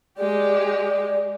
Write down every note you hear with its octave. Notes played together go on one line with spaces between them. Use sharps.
G#3 G4 D5